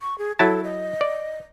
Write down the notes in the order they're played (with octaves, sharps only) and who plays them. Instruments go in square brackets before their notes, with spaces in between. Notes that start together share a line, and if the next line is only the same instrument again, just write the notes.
[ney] C#6
G#4
[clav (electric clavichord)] F#3 E4 A5 [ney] A4
[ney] D#5
[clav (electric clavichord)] D5